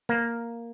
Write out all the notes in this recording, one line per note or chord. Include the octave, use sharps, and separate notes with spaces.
A#3